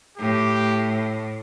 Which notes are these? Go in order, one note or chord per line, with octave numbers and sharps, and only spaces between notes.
A2 G4